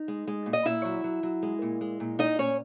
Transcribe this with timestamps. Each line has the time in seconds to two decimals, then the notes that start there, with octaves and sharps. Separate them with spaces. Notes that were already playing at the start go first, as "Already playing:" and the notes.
Already playing: D#4
0.08 G#3
0.27 G#3
0.46 A#2
0.53 D#5
0.65 A#2 E4 E5
0.85 F#3
1.04 F#3
1.23 F#3
1.43 G#3
1.62 A#2
1.81 G#3
2.00 A#2
2.19 A#2 D#4 D#5
2.38 A#2 C#4 C#5